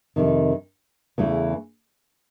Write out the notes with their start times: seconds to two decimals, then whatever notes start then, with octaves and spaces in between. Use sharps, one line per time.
0.16 F2 C3 D#3
1.18 E2 C#3 E3 A3